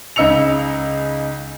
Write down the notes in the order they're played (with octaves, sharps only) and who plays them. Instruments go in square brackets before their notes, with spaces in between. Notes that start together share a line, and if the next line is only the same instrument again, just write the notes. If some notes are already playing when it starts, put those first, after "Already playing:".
[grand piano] C#2 C#3 D#4 E6 C#7 F7